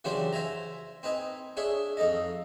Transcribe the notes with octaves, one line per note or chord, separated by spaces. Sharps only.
C#3 E3 F#3 D4 G4 C5
C5 E5 G#5 A#5
C4 D#4 B4 G#5
D4 G#4 C#5 E5
F2 D#4 A4 D#5